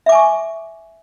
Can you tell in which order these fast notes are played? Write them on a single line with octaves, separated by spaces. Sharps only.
E5 D6 G#5 C#6